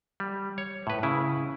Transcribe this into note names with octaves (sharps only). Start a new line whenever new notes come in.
G3
C#5
A2 B4
C#3 E4